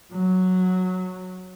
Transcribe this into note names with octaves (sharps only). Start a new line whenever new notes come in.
F#3